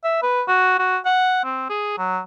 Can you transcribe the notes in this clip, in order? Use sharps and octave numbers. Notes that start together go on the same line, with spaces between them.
E5
B4
F#4
F#4
F#5
C4
G#4
F#3